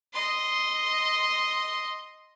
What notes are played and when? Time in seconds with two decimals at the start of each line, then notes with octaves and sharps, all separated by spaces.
0.14 D#5 C6